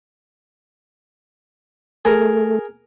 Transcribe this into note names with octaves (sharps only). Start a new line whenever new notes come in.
A3 G#4 A#4